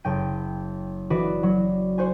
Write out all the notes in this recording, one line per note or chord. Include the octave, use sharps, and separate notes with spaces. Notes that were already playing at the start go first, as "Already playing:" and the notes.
F#1 G5 D#7
E3 F#4 B4 D5 D#5
F#3
F#4 C5 G#5